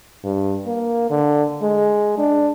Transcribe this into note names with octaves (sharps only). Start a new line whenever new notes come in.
G2
A#3
D3
G#3
D4